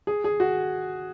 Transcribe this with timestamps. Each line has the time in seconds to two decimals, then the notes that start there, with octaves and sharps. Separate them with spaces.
0.07 G#4
0.24 G#4
0.40 F#4